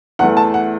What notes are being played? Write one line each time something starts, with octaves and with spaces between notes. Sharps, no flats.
E2 E3 A3 F#5
A5
F#5